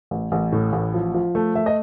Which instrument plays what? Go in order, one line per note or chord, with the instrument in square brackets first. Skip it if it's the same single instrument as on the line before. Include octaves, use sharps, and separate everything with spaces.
[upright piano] A1
A1
A2
A1
F3
F3
A3
A3 E5
D#5